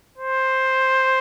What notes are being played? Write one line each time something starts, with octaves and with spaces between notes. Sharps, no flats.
C5